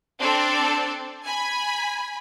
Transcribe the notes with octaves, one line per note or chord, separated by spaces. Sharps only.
C4 D4 A4
G#5 B5